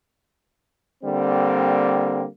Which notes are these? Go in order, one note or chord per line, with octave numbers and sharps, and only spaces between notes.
D3 G3 A#3 C4